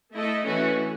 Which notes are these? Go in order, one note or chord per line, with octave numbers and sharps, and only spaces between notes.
A3 E4 A4 D#5
E3 A3 C#4 F#4